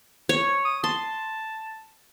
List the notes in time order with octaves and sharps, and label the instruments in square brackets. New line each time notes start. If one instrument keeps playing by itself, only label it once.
[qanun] C#5
[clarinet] D#6
[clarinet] A5 [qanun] C6